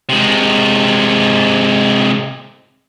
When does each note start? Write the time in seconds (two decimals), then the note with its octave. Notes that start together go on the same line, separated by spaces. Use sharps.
0.09 C3 G#3